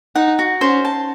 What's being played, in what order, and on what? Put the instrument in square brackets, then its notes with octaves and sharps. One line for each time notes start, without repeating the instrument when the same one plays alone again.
[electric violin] D#4 [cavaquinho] F#5
[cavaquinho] F#4
[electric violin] C#4 [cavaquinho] C5
[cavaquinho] A5